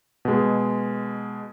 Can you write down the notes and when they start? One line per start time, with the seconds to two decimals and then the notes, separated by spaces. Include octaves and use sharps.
0.25 B2 G#3